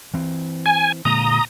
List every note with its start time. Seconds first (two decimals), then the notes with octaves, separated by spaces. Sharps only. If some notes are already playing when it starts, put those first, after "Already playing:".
0.14 E3 C4
0.66 G#5
1.05 A#2 D3 G#3 A#5 D#6